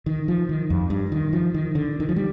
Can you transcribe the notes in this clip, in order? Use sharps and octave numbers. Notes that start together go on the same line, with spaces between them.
D#3
F3
D#3
F2
G2
D#3
F3
D#3
D3
D#3
F3
G3